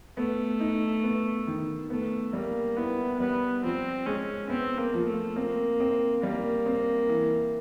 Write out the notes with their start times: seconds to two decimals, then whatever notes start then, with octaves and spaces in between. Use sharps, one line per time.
0.17 A3 B3
0.60 D#4
1.03 B3
1.47 D#3
1.90 A3 B3
2.33 G3 A#3
2.76 B3 E4
3.19 G3 B3
3.63 F3 C4
4.06 G#3 C#4
4.49 B3 C4
4.78 A#3
4.94 F3
5.08 A3
5.36 A#3 C4
5.80 C4
6.22 G3 A#3
6.66 C4
7.09 E3